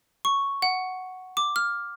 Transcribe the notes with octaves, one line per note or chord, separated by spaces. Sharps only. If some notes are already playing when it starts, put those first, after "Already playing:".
C#6
F#5
D6
F6